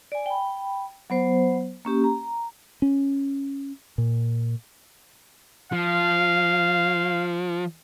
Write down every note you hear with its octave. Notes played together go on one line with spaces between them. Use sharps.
D5 G#5
G5 B5
F#3 B3 C5
A#3 C#4 G4
A#5
C#4
A#2
F3 F5